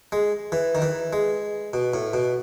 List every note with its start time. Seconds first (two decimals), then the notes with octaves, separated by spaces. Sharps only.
0.12 G#3
0.52 E3
0.75 D#3
0.82 E3
1.13 G#3
1.73 B2
1.94 A2
2.13 B2